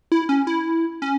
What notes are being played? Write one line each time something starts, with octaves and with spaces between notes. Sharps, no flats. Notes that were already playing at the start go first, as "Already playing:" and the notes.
E4
C#4
E4
C#4